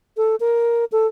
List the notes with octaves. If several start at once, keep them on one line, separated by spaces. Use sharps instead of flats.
A4
A#4
A4